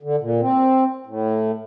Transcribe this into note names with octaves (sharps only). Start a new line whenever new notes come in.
D3
A#2
C4
A2